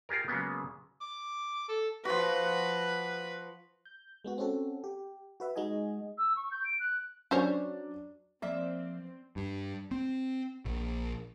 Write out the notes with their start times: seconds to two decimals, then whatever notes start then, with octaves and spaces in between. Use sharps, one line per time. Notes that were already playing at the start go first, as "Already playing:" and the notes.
0.09 F4 G4 G#4 A#4
0.28 C#3 F#3 G#3 A#3 B3
1.01 D6
1.69 A4
2.05 F3 F#4 B4
3.85 G6
4.24 G#3 B3 F#4
4.38 C4 C#4 F#4 A4
4.84 G4
5.40 F#4 B4 E5
5.56 G#3 D#4 F#4 D#5 G#5
6.18 E6
6.36 C#6
6.51 G6
6.65 D7
6.80 F#6
7.31 F#3 C#4 D4 C5 C#5
8.42 F3 A#3 C4 D5 E5
9.36 G2
9.91 C4
10.65 A#1